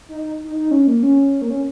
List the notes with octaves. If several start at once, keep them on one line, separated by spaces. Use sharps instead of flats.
D#4
D#4
D#4
D#4
C#4
A#3
C#4
A#3
C#4